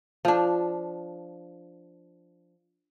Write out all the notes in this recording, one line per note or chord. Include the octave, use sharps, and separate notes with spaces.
F3 D4